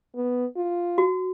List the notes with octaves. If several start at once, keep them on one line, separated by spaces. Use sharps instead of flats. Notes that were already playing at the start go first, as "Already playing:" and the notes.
B3
F4
F#4